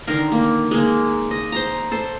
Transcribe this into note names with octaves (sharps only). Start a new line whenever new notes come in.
D3 D#3 A#4 C6
A#3
G#3 A#3
D#5
C5 A#5
A4 C5